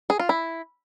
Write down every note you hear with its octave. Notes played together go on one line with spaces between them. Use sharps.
G#4
F4
E4